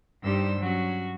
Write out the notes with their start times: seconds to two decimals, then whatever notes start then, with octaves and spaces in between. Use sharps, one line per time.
0.23 G2 G3 D#4 C5 E6
0.58 F#3 C#4 F#4